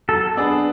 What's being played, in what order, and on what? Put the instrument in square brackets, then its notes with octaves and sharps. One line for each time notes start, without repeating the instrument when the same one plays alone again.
[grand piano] F#3 [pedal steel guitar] A4
[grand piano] B3 D4 G#4 B4